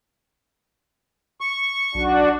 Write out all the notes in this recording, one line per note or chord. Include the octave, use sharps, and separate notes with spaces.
C#6
B1 D4 F#4